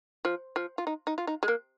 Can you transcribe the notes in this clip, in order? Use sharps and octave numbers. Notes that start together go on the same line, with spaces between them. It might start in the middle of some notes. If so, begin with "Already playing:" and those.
F3
F3
F4
D#4
D#4
F4
D#4
G#3
A#3